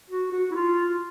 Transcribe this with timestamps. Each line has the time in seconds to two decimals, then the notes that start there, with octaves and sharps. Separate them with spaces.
0.10 F#4
0.32 F#4
0.51 E4
0.55 F4